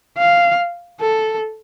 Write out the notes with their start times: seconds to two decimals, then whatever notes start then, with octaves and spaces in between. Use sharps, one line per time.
0.18 F5
1.01 A4